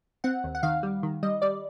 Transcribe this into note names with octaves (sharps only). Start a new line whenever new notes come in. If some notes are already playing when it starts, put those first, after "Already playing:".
C4 F#5
D#2
F#5
D#3 F5
G3
D#3
G3 D#5
G3 D5